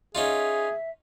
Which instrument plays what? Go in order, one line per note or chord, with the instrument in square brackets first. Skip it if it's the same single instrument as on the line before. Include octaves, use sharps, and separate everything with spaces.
[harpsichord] C#4 D#4 F4 [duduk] G#4 [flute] E5